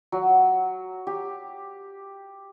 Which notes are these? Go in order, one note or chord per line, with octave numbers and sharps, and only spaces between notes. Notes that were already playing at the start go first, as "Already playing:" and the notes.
F#3
G4